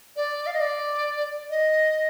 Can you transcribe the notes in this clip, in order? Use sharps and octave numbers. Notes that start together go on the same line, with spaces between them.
D5
F5
D#5
D5
D#5